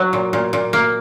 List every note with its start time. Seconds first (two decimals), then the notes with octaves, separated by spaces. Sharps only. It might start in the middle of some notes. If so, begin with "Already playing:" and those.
Already playing: F#3
0.13 A#2
0.33 A#2
0.53 A#2
0.73 A#3